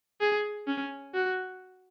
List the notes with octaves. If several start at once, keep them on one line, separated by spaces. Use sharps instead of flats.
G#4
C#4
F#4